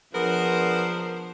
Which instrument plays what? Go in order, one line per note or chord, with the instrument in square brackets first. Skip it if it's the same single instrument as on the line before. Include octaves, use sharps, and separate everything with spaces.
[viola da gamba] F3 D4 C5 [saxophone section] B3 G#4 A#4